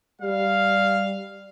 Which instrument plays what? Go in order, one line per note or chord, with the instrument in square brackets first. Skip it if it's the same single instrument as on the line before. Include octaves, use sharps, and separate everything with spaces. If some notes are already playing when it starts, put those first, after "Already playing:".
[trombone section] G3 [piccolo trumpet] F5